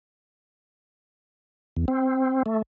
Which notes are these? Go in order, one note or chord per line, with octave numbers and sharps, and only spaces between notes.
E2
C4
A3